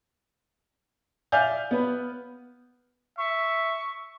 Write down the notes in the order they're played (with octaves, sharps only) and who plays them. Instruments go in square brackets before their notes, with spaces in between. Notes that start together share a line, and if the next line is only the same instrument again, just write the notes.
[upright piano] D5 E5 F5 G#5 F6 G6
B3 B4
[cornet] E5 [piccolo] C#6